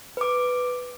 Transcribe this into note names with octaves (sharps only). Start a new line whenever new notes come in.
B4 D6